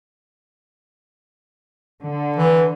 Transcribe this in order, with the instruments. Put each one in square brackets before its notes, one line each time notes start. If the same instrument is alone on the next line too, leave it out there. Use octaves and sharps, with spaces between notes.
[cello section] D3
[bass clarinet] E3